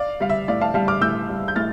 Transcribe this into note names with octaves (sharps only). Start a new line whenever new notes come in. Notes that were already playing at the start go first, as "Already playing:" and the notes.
Already playing: D5 F5
G3 F5
E5
A2 D5 F5
F5 A5
G3 F5 A5
D6 F6
A2 E6 G6
G3
G6
A2 F6 A6